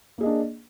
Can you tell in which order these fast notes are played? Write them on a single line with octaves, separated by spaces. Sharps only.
A#3 G#4 D#5 D4